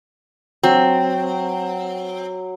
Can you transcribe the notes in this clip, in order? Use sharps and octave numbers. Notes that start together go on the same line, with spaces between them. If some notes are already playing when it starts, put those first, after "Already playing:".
F#3 C4